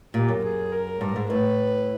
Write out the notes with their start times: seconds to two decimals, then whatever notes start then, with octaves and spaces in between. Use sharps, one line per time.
0.14 A#2 G4
0.28 F#2
0.44 G#4
0.72 A#4
1.01 G2
1.16 G#2
1.30 A2 B4